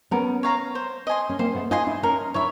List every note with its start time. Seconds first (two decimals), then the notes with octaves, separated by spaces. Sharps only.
0.11 B3 C#4 A#4
0.43 C#5 F5 A#5
0.75 C5
1.07 D#5 G#5 C6
1.29 C#4
1.39 A#3 C4 C5
1.55 A3 B3
1.71 D#4 F4 D#5 G#5 C6
1.87 D4 E4
2.03 C#4 D#4 A#4
2.34 D4 E4 C#5 E5